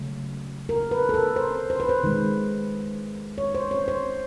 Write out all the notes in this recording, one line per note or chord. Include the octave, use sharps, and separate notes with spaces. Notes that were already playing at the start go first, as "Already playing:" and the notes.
Already playing: C#3 F#3 A3
A#4
B4
A4
A#4
C5
C5
B4
C5
D#3 G#3
C#5
C5
C#5
C5